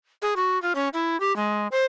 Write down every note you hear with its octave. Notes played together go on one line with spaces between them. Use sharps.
G#4
F#4
F4
C#4
E4
G4
G#3
C5